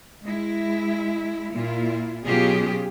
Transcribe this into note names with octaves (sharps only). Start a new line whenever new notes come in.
G#3 E4
A#2 E4 F4
B2 F#3 C#4 F4 G4 G#4